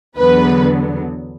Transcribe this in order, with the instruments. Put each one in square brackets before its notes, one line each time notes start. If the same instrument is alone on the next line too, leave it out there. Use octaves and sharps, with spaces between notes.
[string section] E2 D3 F#3 B3 B4